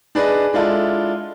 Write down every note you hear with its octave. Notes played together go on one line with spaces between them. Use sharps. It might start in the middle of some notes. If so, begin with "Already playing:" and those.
D4 G#4 B4 D5 D#5
G#3 D4 E4 F4 A4